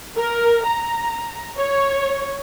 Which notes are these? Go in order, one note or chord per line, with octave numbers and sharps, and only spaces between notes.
A#4
A#5
C#5